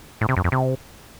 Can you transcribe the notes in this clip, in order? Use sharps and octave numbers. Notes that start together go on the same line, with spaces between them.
A2
C3
F#2
F2
C3